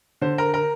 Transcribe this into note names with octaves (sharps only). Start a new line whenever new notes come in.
D3 C5
A#4
A#4